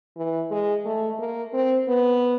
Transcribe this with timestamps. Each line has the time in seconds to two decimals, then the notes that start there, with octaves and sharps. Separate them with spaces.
0.17 E3
0.51 G#3
0.85 A3
1.19 A#3
1.53 C4
1.88 B3